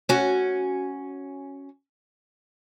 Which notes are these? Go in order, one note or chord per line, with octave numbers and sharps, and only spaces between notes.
C#4 F#4